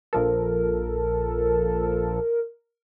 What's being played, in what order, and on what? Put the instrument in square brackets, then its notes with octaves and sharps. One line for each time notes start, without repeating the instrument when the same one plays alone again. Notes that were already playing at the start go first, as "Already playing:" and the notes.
[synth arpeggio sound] A#1 F3 A4 [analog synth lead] A#4